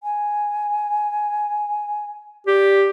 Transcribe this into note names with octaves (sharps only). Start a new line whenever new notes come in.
G#5
G4 D5